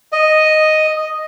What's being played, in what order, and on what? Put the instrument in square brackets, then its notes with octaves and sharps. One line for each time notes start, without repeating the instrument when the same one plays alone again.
[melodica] D#5